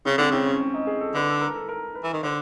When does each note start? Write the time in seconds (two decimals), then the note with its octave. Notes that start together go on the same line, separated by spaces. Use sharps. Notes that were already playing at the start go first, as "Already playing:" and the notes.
0.05 C#3 C4
0.18 D3 C4
0.31 C#3 C4
0.46 C#4
0.60 C#4
0.74 D#4
0.87 G#4
1.01 A4
1.14 D3 B4
1.29 A4
1.41 A#4
1.55 A4
1.69 A#4
1.95 B4
2.04 E3
2.14 D#3
2.23 D3 C5